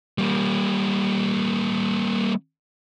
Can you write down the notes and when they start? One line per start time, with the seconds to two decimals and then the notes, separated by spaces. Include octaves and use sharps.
0.18 G3 A#3